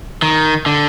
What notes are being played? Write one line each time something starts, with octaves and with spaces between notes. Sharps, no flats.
D#3
D3